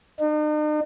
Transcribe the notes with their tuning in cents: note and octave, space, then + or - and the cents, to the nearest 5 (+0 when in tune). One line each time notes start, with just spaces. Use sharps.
D#4 -45